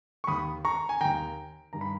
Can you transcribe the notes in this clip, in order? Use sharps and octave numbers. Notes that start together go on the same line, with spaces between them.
C#6
D#2 D#3 B5 D#6
A#5 C#6
G#5
D#2 D#3 G5 A#5
G2 D#3 A#5
B5